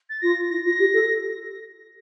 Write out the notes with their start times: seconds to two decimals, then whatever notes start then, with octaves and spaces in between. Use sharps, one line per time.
0.10 A6
0.21 F4 A#6
0.49 E4 A#6
0.64 F4 A#6
0.79 G4
0.93 A4